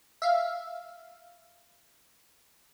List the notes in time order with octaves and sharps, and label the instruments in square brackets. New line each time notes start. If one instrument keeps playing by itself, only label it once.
[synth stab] E5 F5